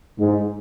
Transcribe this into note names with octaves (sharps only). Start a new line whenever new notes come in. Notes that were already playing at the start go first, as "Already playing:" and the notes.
G#2